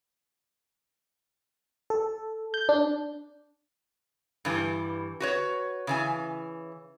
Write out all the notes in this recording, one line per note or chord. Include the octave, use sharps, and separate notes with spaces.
A4
G6
D4
G2 E3 G3
F#4 B4 C#5
C#3 E3 G#5